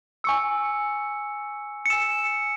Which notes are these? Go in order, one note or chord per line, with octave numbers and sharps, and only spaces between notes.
G#5 C#6 E6 C#7
C#7
G#5 E6 E7